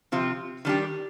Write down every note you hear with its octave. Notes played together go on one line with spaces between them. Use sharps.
C3 F3 C4 F4
D#3 G3 D4 G4